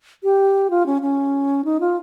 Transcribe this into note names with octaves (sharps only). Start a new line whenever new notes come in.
G4
F4
C#4
C#4
D#4
F4